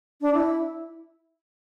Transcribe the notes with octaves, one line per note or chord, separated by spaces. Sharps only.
D4
E4